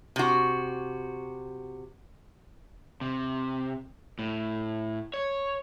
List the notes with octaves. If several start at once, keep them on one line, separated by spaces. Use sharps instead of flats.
C3 F#4
C3
A2
C#5